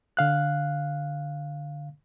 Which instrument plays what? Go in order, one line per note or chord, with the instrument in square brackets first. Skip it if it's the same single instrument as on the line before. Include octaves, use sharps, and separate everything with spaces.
[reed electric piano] D3 F5 F#6